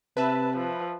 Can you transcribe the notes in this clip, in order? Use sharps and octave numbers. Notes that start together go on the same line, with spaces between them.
C3 B4 E5 A5
F3